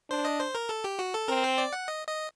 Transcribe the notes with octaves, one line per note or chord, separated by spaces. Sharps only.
D4 C5
D#5
C5
A#4
A4
G4
F#4
A4
C4 A#4
C5
D5
F#5
D#5
D#5